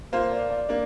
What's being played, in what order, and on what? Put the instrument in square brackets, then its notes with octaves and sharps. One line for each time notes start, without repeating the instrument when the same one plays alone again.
[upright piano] A#3 F4 C5 [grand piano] F5
[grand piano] D5
D5
[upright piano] A#3 D4